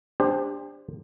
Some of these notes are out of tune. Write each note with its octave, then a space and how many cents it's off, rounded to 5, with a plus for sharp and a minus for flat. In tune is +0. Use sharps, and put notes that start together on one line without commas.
D4 +0 G4 +30 C5 +0